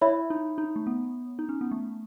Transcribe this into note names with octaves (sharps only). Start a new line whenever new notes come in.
E4 C#5 E5 B5
D#4
D#4
A3
B3
D#4
C#4
B3
A3